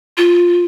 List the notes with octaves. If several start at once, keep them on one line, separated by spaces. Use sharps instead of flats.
F4